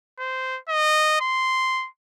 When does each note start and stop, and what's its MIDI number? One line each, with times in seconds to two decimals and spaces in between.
0.19 0.59 72
0.69 1.19 75
1.21 1.88 84